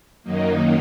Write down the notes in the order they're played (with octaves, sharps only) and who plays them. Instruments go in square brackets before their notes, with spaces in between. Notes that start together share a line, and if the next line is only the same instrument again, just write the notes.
[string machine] F#2 D#3 F#3 A#3 D#4